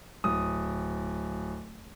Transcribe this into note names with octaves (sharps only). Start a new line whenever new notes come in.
D1 D#6